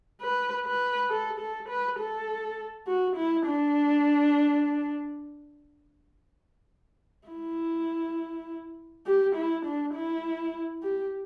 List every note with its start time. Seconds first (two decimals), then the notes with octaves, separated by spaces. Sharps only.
0.22 B4
0.66 B4
1.10 A4
1.40 A4
1.68 B4
1.99 A4
2.87 F#4
3.16 E4
3.46 D4
7.29 E4
9.06 G4
9.36 E4
9.65 D4
9.94 E4
10.83 G4